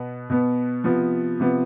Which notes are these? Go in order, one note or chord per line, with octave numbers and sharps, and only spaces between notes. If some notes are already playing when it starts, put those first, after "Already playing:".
Already playing: B2 B3
B2 B3
C3 F3 B3
C3 F3 B3